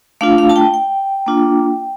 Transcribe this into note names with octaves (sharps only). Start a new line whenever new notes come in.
A3 D4 F4 F5
F5
A5
G5
G5
A#3 D4 F4